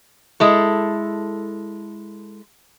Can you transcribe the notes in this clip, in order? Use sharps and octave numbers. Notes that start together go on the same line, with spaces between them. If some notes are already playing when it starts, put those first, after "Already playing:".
G#3 E4 A4